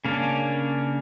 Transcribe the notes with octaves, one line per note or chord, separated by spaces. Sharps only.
C#3 A#3 C#4 D4